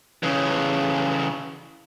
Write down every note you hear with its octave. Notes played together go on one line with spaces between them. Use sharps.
C#3 E3